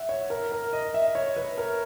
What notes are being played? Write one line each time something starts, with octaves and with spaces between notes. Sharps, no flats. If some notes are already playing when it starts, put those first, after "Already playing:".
Already playing: E5 F#5
C#5
A#4
A#4
D#5
E5
C#5
B4
A#4